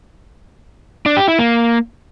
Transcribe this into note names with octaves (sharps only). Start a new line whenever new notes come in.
D4
G4
E4
A#3